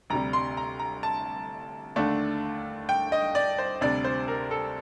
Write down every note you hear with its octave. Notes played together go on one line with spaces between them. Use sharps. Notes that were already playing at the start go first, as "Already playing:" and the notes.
D2 C3 G3 A#5
C6
A#5
A#5
A5
D#2 D3 A3 D4
G5
D#5
D5
C5
D2 C3 G3 D4 D5
C5
A#4
A4